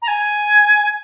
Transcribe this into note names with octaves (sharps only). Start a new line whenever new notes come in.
A#5
G#5